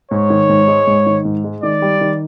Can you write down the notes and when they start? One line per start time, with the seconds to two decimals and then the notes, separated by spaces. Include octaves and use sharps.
0.11 G#2 C#5
0.30 D#3
0.49 G#2
0.68 G#3
0.87 G#2
1.06 D#3
1.25 G#2
1.44 G#3
1.63 D#3 D5
1.82 G3
2.01 D#3